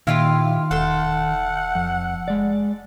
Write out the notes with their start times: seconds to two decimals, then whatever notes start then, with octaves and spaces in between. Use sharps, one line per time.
0.07 A#2 D#3 E4 F4 G4 F5
0.71 E1 A4 F#5 C6
1.75 F2
2.28 G#3 D5